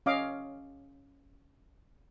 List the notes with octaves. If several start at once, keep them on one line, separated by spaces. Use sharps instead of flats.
C#4 D#5 F5 D6